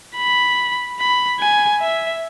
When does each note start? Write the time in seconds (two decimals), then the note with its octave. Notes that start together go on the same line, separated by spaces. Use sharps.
0.17 B5
1.00 B5
1.40 G#5
1.81 E5